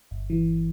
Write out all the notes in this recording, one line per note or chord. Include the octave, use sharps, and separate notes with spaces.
G1
E3